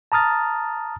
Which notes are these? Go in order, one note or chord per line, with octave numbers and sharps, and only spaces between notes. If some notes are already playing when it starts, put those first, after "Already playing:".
A5 A#5 D#6 F6 A6